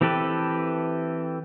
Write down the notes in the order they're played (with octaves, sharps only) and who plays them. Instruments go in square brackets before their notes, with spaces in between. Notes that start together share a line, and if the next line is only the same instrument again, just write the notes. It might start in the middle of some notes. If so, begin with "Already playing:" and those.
[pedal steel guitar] E3 C4 G4 A4 B4